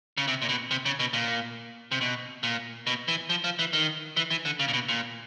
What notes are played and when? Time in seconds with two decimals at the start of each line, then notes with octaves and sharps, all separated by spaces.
0.17 C#3
0.27 C3
0.42 A#2
0.49 B2
0.71 C3
0.85 C#3
1.00 B2
1.13 A#2
1.91 C3
2.01 B2
2.43 A#2
2.87 B2
3.08 E3
3.30 F3
3.44 F3
3.59 E3
3.73 D#3
4.17 E3
4.31 E3
4.45 D3
4.59 C#3
4.68 A#2
4.73 B2
4.88 A#2